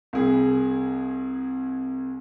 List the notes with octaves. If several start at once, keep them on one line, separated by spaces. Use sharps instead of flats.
C2 G#4